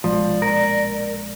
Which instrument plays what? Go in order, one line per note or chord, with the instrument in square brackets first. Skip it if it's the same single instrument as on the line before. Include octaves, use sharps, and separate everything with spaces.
[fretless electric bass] A#1 B2 G#3 [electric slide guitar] F3 [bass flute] D5
[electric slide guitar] A#4